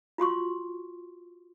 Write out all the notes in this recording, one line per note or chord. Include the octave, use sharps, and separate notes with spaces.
F4 F#4 C6 C#6